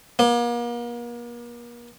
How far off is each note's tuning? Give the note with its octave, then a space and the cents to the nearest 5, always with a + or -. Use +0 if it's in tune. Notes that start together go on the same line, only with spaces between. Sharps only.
A#3 +40